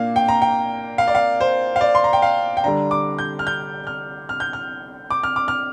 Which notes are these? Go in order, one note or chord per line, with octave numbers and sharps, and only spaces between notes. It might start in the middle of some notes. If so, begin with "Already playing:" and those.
Already playing: A#2 A#3 D4 F5
G5
A#5
G5
F5
D5
F5
C5
F5
D5
C6
A#5
G5
F5
G5
D3 G3 D4 A#5
D6
G6
F6
G6
F6
F6
G6
F6
D6
F6
D6
F6